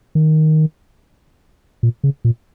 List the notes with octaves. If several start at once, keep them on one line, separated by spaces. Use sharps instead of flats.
D#3
A#2
C#3
A#2